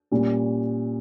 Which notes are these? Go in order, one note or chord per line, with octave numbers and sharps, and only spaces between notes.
A#2 G3 C#4